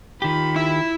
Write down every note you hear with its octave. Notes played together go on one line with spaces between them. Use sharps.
D#3 F4 G4 B5
E4 E5